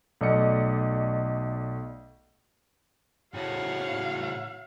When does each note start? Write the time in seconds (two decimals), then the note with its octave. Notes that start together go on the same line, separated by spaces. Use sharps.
0.21 B1 A3 D5 D#5 C#7
3.34 A2 C#3 F#4 C#5 F5 F#5